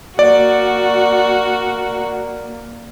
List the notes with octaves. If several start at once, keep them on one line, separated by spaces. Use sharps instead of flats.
A#3 F#4 D5